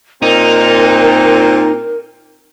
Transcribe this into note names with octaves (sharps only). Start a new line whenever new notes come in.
A#2 C4 D#4 A#4